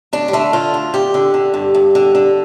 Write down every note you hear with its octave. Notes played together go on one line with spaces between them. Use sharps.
D2 D4
G3
D3 A3
D3 F4
D2
D2 G4
D3
D3
G2
G2
D3
D3